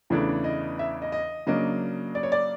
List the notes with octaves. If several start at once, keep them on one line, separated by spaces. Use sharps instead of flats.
E2 C#3 E3 A3 D4
D#5
E5
D#5
D#5
C#3 F#3 A#3 D4 D#5
D5
C#5
D5